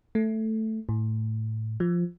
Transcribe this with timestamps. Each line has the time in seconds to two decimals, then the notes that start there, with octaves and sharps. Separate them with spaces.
0.15 A3
0.89 A2
1.80 F3